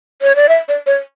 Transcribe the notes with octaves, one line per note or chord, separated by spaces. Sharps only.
C#5
D5
E5
D5
C#5